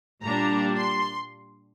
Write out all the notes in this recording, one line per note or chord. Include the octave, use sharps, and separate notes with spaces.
A#2 G3 D4 A#5
C6